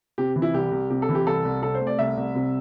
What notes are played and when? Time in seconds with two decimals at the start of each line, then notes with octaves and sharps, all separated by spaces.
0.18 C3 G4
0.36 E3
0.42 E4
0.54 C2 G4
0.72 C2
0.90 C3 G4
1.02 A4
1.09 E3
1.15 G4
1.26 C2 A4
1.45 C2
1.62 C3 A4
1.75 C5
1.81 A3
1.87 D5
1.99 C2 E5
2.17 C2
2.35 C3